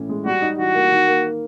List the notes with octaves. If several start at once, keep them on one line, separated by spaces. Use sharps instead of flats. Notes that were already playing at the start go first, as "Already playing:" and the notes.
Already playing: A2 E3 C#4
G#3
G3 F#4
D#4
E3 F#4
A#3
D#3
A#3